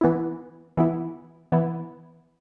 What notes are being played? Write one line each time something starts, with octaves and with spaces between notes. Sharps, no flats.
E3 B3 E4
E3 B3 E4
E3 B3 E4